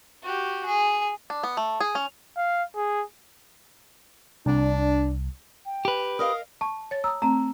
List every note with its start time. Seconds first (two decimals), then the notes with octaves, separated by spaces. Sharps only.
0.23 F#4 G4
0.66 G#4
1.30 D4
1.43 B3
1.57 A3
1.80 G#4
1.95 C#4
2.37 F5
2.76 G#4
4.46 C2 D4
5.65 G5
5.85 G4 B4
6.19 A#4 D#5 F5 D#6
6.61 A5 C#6
6.91 C#5 A6
7.04 A#5 D#6 E6
7.22 A3 C4 A#5